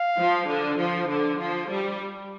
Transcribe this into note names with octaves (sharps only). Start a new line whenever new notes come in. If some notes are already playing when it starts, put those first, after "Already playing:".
Already playing: F5
F3
D3
F3
D3
F3
G3